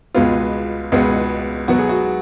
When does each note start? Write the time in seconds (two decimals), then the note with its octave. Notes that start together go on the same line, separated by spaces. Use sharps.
0.15 C#2 B2 G#3 B3 F4
0.92 C#2 B2 G#3 B3
1.68 B2 F#3 B3 F#4
1.79 G#4
1.89 F#4